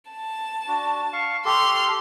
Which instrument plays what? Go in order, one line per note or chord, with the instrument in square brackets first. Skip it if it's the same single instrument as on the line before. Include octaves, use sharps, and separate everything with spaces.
[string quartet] A5
[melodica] D4 F#4
F5 C#6
[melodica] G4 A4 [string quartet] C6 F6